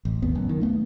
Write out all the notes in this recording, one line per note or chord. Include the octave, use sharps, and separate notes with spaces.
A1
G#1 D#2 B3
F#1 F#2
D#3
A3 B3